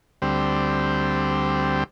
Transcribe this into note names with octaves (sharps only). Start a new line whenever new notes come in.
D2 G3 C4